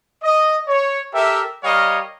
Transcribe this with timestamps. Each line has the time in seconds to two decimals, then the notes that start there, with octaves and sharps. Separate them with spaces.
0.23 D#5
0.68 C#5
1.14 G4 A4 A#4 E5
1.64 G3 A#4 C#5 D#5 F5